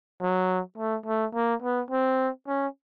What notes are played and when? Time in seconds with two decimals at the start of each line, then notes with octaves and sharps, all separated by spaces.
0.22 F#3
0.78 A3
1.06 A3
1.35 A#3
1.62 B3
1.91 C4
2.48 C#4